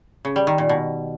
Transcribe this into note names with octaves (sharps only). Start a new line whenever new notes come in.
C#3
G3
D#3
A#2
B2